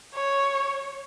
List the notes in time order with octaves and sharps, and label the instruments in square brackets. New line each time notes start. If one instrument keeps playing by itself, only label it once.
[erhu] C#5